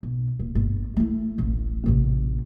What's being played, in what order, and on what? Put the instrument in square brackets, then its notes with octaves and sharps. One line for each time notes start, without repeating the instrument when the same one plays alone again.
[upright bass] B1
D#1
G1
A3 E4
D1 A1
A1 C3